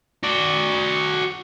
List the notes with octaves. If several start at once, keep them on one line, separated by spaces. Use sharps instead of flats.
F#4 D5